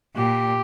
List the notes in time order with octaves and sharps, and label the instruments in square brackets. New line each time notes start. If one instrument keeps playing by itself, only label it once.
[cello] A#2 [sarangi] G4